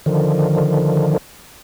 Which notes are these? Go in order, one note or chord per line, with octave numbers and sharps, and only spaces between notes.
D3 D#3 F3